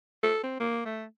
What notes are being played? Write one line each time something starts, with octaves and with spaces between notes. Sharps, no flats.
A4
C4
A#3
A3